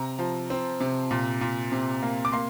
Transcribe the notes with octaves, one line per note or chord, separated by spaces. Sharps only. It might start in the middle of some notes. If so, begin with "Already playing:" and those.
Already playing: C3 A#5
F3
C4
C3
A#2
A#2
C3
A#3
D6
A#3 C6